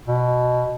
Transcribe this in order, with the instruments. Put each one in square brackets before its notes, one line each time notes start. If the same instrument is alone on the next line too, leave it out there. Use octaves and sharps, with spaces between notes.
[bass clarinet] B2